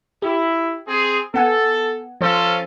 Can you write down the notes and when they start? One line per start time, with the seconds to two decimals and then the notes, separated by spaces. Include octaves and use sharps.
0.22 E4 G4
0.87 C4 G#4
1.34 B3 A4 F#5 G#5
2.21 F3 C#4 F4 A4 C5